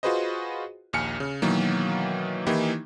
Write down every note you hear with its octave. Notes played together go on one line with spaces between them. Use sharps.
F4 F#4 G#4 B4 C5 D#5
A#1 D#2 G#5 F6 C#7
C#3
B2 D#3 E3 F#3 A#3
D#3 E3 A#3 D#4 E4 G4